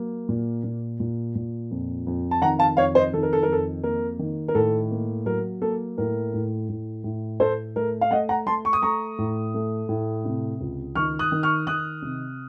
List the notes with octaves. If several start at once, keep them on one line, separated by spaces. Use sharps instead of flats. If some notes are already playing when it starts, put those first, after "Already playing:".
Already playing: F#3 A#3
A#2
A#2
A#2
A#2
F2
F2
A5
D#3 F#5 A#5
F5 A5
F2 C#5 F5
C5 D#5
D#3 A4
A#4
A4
A#4
F2 A4
A#3 A#4
D#3
A#4
A2 A4
A#3
F#3 A#4
A#3 A4
A2 A#4
A2
A2
A2
A2 A4 C5
A3 A#4
F5
A3 D#5 F#5
F#5 A#5
A3 A5 C6
C#6
D#6
A3 A#5 C#6
A2
A3
A2
C3
C#2
D#3 C#6 F6
D#6 F#6
D#3
C#6 F6
D#3 D#6 F#6
C3